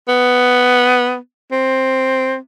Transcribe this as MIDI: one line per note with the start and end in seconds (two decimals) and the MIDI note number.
0.08 1.16 59
1.51 2.36 60